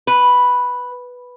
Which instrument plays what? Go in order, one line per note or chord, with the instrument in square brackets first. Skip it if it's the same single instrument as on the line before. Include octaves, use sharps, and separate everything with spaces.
[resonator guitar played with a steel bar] B4